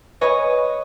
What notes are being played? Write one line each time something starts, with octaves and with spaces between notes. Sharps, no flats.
B4 C#5 D#5 G#5